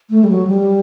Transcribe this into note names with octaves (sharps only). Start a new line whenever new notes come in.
A3
G3
F#3
G3